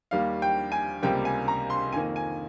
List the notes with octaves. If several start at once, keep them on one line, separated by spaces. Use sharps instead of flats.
D#2 D#3 G3 F5
G5
G#5
C#2 C3 G3 A#3 G5
G#5
A#5
C6
F2 D#3 A#3 G#5
G#5